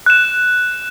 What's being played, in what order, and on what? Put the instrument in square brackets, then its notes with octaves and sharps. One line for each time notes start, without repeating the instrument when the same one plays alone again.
[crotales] F#6 E7